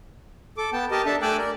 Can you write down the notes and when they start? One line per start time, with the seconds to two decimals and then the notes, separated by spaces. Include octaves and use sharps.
0.58 A4 D6
0.73 B3 G5 A5
0.91 G4 A#4 D#5 A5
1.06 D4 A4 E5 A5
1.22 A3 G5 G#5 D6 E6 F#6
1.38 A#4 D5